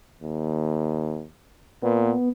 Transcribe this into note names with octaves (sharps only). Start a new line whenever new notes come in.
D#2
A#2 B3